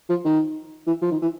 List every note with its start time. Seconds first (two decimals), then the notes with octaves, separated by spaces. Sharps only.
0.09 F3
0.25 D#3
0.87 E3
1.02 F3
1.11 D#3
1.22 E3